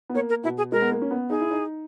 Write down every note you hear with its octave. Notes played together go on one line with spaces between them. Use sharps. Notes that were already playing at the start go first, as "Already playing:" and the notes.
B3
A#3 C#5
A#4
B2 E4
G#4
G#3 A#4
B3
A#3
C#4
B3
D#4 G#4
E4
D#4